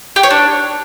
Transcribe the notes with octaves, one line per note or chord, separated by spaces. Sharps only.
G4
C#5
D4